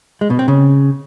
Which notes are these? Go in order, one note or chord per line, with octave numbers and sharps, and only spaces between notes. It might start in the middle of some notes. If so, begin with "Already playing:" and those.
G#3
B2
C4
C#3